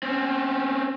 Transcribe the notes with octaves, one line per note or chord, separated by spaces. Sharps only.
C4 C#4